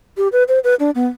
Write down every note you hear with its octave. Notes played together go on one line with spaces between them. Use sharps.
G4
B4
C5
B4
D4
B3